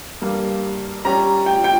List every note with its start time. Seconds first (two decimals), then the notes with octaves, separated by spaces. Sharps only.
0.22 G2 G3 A#3
1.05 G3 C#4 G4 A#5
1.46 G5
1.64 G5